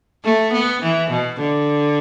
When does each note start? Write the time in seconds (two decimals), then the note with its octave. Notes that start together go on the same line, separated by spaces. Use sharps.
0.24 A3
0.53 B3
0.82 E3
1.11 B2
1.39 D3